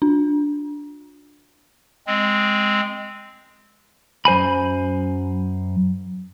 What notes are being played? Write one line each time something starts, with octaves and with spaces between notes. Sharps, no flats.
D4
G#3 C4
F#2 C5 G#5 B5